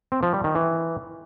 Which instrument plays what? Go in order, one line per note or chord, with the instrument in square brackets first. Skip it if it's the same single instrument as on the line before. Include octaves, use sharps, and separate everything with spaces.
[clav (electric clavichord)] C4
F3
G3
D#3
E3